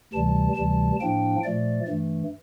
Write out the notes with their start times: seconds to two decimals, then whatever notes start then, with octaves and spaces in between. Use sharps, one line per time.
0.13 D2 C3 E3 G3 A5
0.56 D2 C3 E3 G3 A5
1.01 A2 F3 A#3 D4 G5
1.44 A#2 F3 A3 D5
1.88 G2 E3 A3